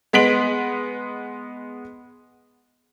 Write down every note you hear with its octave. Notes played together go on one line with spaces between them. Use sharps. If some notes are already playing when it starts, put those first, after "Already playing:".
G#3 B3 B6 D7 F#7